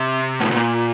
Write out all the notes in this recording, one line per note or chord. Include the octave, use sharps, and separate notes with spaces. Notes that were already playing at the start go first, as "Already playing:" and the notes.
Already playing: C3
A2
A#2